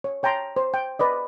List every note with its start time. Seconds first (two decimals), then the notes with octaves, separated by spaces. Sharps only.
0.04 C#5
0.23 C#5 G5 A5 A#5 C6
0.56 C5
0.74 G5
0.99 B4 D5 D#5